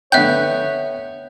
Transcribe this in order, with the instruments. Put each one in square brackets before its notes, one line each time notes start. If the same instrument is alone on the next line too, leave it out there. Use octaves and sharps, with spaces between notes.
[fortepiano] D3 B3 G5 [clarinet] C#5 [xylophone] E5 F#6 G6